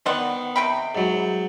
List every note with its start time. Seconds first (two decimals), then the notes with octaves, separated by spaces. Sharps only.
0.06 D#3 B3 C5 D5 F#5
0.56 C3 G5 B5
0.95 G#2 F#3